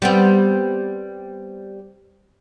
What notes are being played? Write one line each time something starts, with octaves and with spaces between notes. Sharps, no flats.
G3 B3 C4